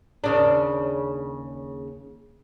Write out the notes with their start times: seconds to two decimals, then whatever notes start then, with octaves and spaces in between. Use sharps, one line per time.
0.24 D#2 C#3 D4